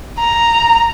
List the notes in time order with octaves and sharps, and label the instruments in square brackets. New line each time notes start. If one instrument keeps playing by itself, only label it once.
[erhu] A#5